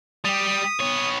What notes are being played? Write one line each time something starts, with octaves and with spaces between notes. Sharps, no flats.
G3 G4 D#6
B3 C#5